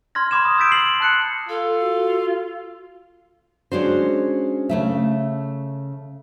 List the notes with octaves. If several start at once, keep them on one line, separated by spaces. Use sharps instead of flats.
C6 F6 G#6 A#6
B5 C6 D6 G#6 E7
D#6
E6 G6 A6 B6 D7
C7 F#7
A5 F#6 C#7
F4 A4
F#4
G#3 C#4 D4 F#4 C5
C#3 A3 E5